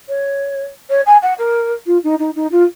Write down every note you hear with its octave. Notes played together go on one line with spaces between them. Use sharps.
C#5
C#5
G#5
F#5
A#4
F4
D#4
D#4
D#4
F4